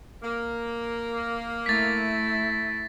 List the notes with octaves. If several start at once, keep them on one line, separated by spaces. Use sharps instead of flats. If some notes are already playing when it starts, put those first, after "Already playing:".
A#3
A3 E4 A6 B6